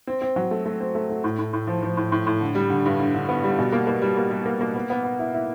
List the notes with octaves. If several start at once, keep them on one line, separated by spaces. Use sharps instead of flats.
C4
C4
F#3
A3
A3
C4
A3
A3
A2
A2
A2
F3
F3
A2
A2
A2
D3
G3
D3
G2
D3
D3
B3
G3
B2
A#3
A#3
G3
A#3
G3
A#3
A#3
B3
B3
B3
E4
E4